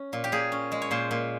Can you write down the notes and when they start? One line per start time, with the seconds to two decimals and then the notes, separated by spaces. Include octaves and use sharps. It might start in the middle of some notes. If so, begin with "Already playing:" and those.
Already playing: C#4
0.13 A#2
0.24 G4
0.32 A#2 G#4
0.52 C#4
0.72 G#3
0.82 C#5
0.91 A#2 C5
1.11 A#2